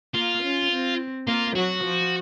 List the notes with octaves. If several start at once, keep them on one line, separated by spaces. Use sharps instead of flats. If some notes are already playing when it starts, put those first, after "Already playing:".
A#3 F4
C#4
C4
A#3 F4
F#3 F#4
F3